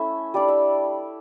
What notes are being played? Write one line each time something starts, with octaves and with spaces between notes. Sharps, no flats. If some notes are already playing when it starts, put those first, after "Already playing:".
Already playing: A3 C#4 E4 E5
G3 D4 D5
E5